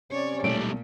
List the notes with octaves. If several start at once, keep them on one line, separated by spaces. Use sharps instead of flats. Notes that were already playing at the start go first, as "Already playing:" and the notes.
C3 C#4 C#5 D5
B1 A#2 G3 A3 D7